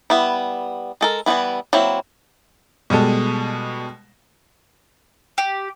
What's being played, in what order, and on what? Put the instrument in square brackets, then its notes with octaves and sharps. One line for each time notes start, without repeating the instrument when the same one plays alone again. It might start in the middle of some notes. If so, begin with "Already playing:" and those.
[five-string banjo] G3 B3 E4
G#3 A4 A#4
E3 G3 G#3 B3 E4
F#3 A#3 C4 E4
[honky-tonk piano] B2 G3 G#3 A4
[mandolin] G4